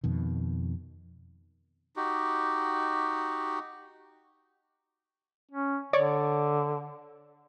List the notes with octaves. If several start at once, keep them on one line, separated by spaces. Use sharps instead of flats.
F2 B2 D#3
D#4 F#4 G4
C#4
D3 C#5 D5